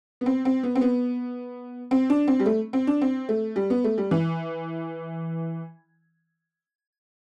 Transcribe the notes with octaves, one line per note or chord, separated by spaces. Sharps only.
B3
C4
C4
B3
C4
B3
C4
D4
C4
G3
A3
C4
D4
C4
A3
G3
B3
A3
G3
E3